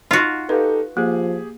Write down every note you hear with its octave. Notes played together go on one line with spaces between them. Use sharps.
D#4 F4 F#4
D#4 G4 A4 B4 F5
F3 A#3 G4 G#4